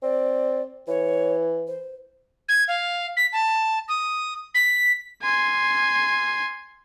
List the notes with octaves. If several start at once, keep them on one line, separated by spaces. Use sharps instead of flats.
C4 D5
E3 C#5
C5
G#6
F5
B6
A5
D#6
B6
G#5 C6